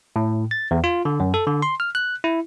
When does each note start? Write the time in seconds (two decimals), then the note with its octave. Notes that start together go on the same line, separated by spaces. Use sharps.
0.16 A2
0.51 A6
0.71 E2
0.84 F4
1.05 D3
1.20 F#2
1.34 A4
1.47 D3
1.62 C6
1.80 F6
1.95 F#6
2.24 E4